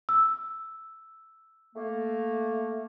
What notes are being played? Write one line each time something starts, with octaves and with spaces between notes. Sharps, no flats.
E6
A3 A#3